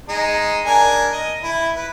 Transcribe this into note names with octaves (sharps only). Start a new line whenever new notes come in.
G#3 D#4
D4 A#4 G#5
D#5
E4
B4